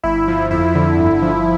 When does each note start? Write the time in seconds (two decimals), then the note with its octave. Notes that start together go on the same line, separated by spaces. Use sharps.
0.04 G1 E4
0.28 F3
0.51 F2 E4
0.75 D3
0.99 G1
1.22 F3